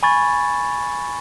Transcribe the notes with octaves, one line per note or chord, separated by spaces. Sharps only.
G#5 B5 C#6 G#6 A6